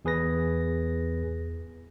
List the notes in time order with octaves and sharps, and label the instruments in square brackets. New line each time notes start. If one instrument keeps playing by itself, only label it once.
[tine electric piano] E2 G#4 B4 A#6